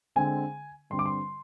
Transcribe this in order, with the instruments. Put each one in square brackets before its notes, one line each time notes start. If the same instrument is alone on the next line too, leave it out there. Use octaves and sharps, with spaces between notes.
[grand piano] D3 G#3 C4 G#5
G2 D3 G3 C4 C6
D6
C6